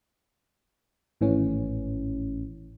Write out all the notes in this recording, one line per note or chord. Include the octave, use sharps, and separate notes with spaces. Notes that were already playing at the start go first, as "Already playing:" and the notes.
G#1 A2 E3 C#4